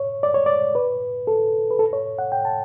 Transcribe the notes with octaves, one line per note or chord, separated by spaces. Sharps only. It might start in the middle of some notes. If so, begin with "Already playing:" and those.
Already playing: C#5
D5
C#5
D5
B4
A4
B4
A4
C#5
F#5
G5
A5